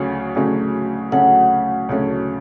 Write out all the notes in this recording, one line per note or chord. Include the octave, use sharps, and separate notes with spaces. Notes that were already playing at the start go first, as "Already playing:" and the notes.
Already playing: D2 C#3 F#3 A3 C#4
D2 C#3 F#3 A3 C#4
D2 C#3 F#3 A3 C#4 F#5
D2 C#3 F#3 A3 C#4